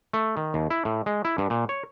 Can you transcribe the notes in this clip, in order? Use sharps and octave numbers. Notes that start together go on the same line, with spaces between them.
A3
D#3
D#2
E4
A2
G#3
E4
G2
A#2
C#5